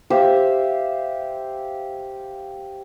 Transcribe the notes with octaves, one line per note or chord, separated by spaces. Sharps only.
G4 C5 E5 F5